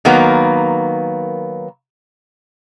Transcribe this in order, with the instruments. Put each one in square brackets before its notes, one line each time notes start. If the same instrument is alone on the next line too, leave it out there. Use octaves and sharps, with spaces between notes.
[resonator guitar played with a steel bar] D#3 F#3 A#3 B3